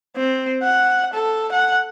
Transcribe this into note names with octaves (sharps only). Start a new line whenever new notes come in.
C4
F#5
A4
F#5